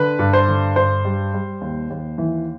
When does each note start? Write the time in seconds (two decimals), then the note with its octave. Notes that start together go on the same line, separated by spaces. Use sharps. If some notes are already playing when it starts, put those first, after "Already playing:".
Already playing: D3 B4
0.19 G2
0.33 C5
0.48 D3
0.76 G2 C5
1.04 G3
1.34 G3
1.61 D#2
1.90 D#2
2.18 E3